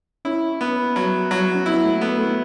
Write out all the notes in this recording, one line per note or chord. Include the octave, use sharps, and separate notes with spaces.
C#4 E4
B3
F#3
F#3
C#4
B3 E4
A3
A3 B3
A3